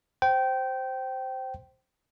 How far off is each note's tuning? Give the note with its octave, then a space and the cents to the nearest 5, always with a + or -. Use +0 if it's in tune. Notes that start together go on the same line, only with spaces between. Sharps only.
C5 +0 G5 -20